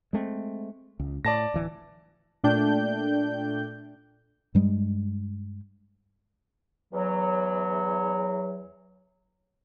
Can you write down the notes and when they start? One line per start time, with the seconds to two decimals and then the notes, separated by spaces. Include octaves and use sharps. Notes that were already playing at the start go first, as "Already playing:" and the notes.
0.13 G#3 A3 C4
0.99 C#2
1.25 A2 D5 A5 A#6
1.54 D1 E3
2.44 A#2 A3 D4 G5 G6
4.55 G2 G3 G#3
6.92 E2 F#3